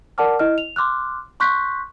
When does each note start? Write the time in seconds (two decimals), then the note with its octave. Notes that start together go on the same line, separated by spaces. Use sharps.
0.18 A#4 D5 F#5 A5 D6 F6
0.39 E4 D#5 F6
0.58 F7
0.76 C6 D6 F6 F#6
1.40 C6 C#6 F#6 G6 B6